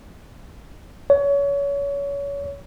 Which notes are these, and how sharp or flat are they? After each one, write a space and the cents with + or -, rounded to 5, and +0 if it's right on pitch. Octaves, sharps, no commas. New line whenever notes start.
C#5 +30